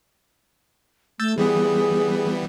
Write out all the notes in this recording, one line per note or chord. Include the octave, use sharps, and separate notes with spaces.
A3 E6 G6 A6
E3 G3 B3 G#4